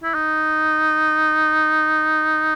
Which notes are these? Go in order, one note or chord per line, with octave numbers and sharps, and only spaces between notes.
E4
D#4